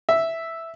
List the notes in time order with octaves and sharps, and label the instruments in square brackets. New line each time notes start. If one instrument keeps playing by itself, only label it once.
[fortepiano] E5